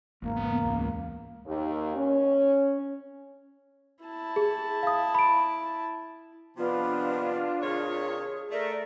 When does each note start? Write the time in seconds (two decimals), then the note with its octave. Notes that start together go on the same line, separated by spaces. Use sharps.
0.22 G#1 E2 G#2 C#3 A#3
0.36 B3
0.65 C#2
1.47 D#2
1.95 C#4
4.03 E4 A5
4.36 G#4
4.83 F5 D#6
5.15 B5 D7
6.57 C3 D#3 F3 B3 D4 F4
7.61 C3 D#3 G#4 C#5
8.51 A3 A#4 D5 E5